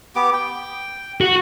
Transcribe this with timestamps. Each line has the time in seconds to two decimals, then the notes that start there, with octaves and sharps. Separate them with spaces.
0.16 B3 G4 D6
0.34 G5
1.21 F#4